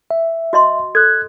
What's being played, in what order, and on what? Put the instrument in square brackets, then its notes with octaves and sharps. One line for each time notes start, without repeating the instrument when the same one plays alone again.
[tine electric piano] E5
[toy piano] F#4 D#5 C6
[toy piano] A4 [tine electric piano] F#6 G#6